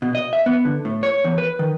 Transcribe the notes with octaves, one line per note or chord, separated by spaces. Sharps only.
B2
D#5
E5
B3
D3
A2
C#5
E2
B4
D#3